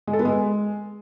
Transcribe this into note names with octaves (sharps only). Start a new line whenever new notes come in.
G#3
A4
B3
G#3